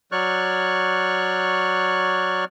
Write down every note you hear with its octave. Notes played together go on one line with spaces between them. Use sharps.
F#3 C#5 D5 C#6 F6 F#6